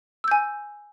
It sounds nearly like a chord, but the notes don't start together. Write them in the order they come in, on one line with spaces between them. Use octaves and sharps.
E6 G6 G#5